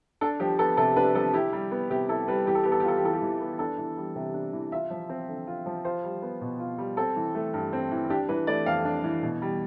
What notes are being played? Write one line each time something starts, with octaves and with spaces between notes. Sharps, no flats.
D4 A4
F3 G4
B3 A4
C3 A4
D4 B4
F3 A4
E4 G4
G3
B3
C3 G4
E4 A4
G3 B4
E3 G4
A4
B3 G4
A4
G4
F4 A4
G4
E3 A4
G4
E3
B3
D4 A4
E3
G3
C3
D4
E3
F4 E5
F3
C4
D3
F4
F3
F4 C5
G3
B3
B2
F4
G3
C4 A4
E3
A3
G2
C4
E3
D4 G4
E3 B4
A3 D5
F2 F5
D4
E3
B2
G3